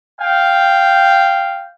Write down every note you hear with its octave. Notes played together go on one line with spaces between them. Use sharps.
F5 G5